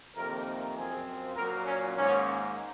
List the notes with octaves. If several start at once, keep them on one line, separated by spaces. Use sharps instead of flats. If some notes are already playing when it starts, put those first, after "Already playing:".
F2 C3 D#3 A#3 A#4
F#2 F3 C4 G#4
A#2 F#3 A#3 A#4
C#4
G#2 D#3 A#3 C#4